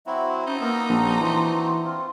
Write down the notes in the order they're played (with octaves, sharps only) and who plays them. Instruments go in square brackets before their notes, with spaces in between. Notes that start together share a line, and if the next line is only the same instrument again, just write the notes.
[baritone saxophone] F#3 [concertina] C4 E4 F#4 [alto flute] E5
[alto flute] C#4 [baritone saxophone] D#4 [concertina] C5
[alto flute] A#3 [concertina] B3 A#4 E6
[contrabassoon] A#1 [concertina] C4 D4 F#4
[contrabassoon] E3 [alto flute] C6
[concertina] C4 F4